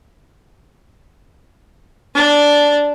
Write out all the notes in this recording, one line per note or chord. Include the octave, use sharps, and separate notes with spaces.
D4 D5